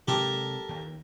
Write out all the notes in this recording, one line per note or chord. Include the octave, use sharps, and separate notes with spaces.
C3 F#3 G#3 G4 A4 A#4
D#2